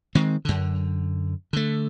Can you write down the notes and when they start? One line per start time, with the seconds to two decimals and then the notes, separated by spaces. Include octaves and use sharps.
0.15 D#3 G#3 C4
0.45 F#2 D3
1.53 D3 A3